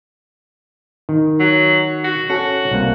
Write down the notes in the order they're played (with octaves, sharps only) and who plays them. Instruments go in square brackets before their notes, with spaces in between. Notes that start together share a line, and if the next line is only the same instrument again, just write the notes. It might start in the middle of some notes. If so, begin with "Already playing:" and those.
[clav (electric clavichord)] D#3
[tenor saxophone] F#3
F#4
[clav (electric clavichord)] C#4 A4 [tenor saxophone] F#4
[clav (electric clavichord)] C2 A#3